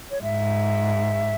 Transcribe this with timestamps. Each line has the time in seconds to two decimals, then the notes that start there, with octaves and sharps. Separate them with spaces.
0.11 C#5
0.22 G#2 E5